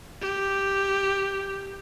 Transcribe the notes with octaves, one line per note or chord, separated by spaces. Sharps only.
G4